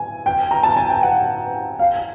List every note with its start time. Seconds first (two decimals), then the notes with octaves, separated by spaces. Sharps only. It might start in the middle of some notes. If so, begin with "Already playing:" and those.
Already playing: G#5
0.26 G5
0.51 A#5
0.63 A5
0.77 G#5
0.89 G5
1.03 F#5
1.79 F5